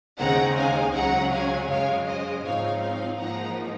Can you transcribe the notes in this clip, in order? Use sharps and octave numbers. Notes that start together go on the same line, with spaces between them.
D#2 C#3 G#3 C4 D#4 F#5 A#5
F5 G#5
C#2 C#3 F#3 F#5 A#5
F5 G#5
F#2 C#3 G#3 C#5 F5
C5 D#5
G#2 F3 C4 D#4 C#5 F5
C#5 F5
G#2 F3 A#3 D#4 F#5 A#5